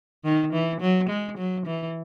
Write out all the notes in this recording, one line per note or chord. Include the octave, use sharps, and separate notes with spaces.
D#3
E3
F#3
G#3
F#3
E3